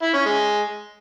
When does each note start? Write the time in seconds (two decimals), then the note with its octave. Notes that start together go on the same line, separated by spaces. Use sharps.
0.02 E4
0.14 C#4
0.25 G#3